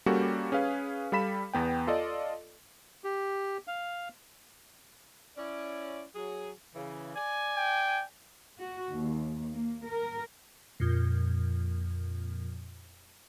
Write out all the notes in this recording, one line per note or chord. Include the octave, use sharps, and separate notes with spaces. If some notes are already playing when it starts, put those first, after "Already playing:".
G3 A#3 C#4 F#4 G4 A4
C#4 G#4 B4 F5
G3 A4 F5 B5 B6 E7
E2 B3 G5
F4 A4 D5 D#5
G4
F5
C#4 E4 D5
F#3 G#4
C#3 E3
D5 G#5
G5
F#4
D#2
A#3
A#4
F2 A#2